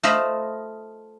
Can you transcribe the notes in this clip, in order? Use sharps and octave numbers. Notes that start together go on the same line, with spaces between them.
A3 F4 C5 D#5 B5